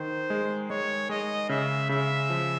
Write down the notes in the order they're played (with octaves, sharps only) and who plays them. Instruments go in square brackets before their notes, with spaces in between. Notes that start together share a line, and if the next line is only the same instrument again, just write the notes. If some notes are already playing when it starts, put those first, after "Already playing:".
Already playing: [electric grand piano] D#3 [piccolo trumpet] C5
[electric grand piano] G#3
[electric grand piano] G#3 [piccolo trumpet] C#5
[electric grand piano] G#3 [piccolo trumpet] D#5
[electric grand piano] C#3 [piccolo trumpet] E5
[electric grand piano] C#3 [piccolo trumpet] E5
[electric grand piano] F3